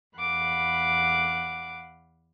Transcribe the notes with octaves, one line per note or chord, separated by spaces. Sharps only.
E2 F5 F#5 B5 D6 F#6